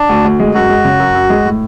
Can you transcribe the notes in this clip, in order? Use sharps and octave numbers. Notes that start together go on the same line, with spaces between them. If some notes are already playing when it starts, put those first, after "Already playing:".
Already playing: D4
D2
D2
G#3
F#2 F#4
G#3
C#3
F#2
F#2
G#3
A2